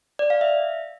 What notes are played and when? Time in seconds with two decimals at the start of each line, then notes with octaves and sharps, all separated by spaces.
0.19 D5
0.30 F5
0.41 E5